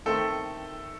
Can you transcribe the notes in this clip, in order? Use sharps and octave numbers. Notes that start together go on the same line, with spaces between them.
D#3 A3 C4 A4